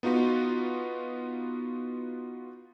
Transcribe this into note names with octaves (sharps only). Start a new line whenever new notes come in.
B3 D#4 F4 F#4 B4